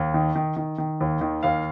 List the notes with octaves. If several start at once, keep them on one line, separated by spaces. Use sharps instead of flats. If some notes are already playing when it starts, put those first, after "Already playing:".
Already playing: D#2
D#3
D#3
D#3
D#3
D#2
D#3
D#2 F5